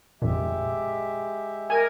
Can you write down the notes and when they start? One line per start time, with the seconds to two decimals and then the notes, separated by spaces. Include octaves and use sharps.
0.22 G1 F2 A#2 G#3 G4 E5
1.70 A#4 G#5